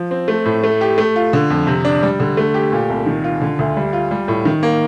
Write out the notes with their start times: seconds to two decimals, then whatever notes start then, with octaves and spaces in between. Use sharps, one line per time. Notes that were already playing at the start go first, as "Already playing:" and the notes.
Already playing: F3
0.11 C4
0.28 A3
0.45 A2
0.64 A3
0.81 G4
0.98 A3
1.16 F4
1.33 D3
1.50 F2
1.67 C3
1.85 D4
2.03 G3
2.20 D3
2.37 A3
2.54 G4
2.72 A#2
2.90 C2
3.06 D#3
3.24 F4
3.42 D3
3.59 D2
3.77 G3
3.93 F4
4.11 G3
4.28 A2
4.45 D#3
4.63 A#3